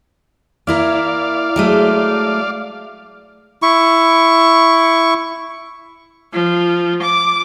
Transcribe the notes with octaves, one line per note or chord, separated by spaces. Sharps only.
A#3 E4 A#4 D5 F5
F#3 G#3 A3
E4 C#6
F3
D6